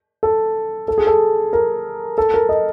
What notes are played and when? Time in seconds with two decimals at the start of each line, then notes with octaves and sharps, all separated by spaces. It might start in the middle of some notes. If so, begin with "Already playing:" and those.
0.23 A4
0.88 A4
0.98 G#4
1.07 A4
1.53 A#4
2.18 A4
2.34 A#4
2.49 D#5